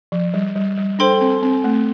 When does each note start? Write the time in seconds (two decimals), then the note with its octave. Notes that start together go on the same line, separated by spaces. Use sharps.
0.12 F3
0.34 G3
0.56 G3
0.77 G3
0.99 D4 A4 C5 G5 C6
1.21 C4
1.43 C4
1.64 A3